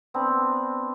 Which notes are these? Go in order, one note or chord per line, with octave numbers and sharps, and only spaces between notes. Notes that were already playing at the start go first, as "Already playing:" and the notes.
B3 C4 D4